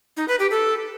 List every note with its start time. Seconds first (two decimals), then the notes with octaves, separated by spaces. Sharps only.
0.17 D#4
0.28 B4
0.39 G4
0.51 A4